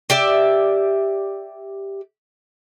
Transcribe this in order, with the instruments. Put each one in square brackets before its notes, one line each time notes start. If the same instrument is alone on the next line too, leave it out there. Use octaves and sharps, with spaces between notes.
[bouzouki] G4 D5 E5